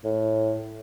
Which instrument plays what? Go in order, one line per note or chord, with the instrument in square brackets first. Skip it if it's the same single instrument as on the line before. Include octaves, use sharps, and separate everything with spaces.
[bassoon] A2